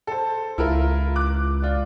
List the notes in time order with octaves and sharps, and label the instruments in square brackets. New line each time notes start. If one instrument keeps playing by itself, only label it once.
[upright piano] A4 C5
[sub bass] C#2 [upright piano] E4 F4 A#4
[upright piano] D6 F#6
F4 D5